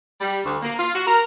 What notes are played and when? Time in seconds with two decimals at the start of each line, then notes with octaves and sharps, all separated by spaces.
0.21 G3
0.44 D2
0.62 A#3
0.78 F4
0.95 F#4
1.06 A#4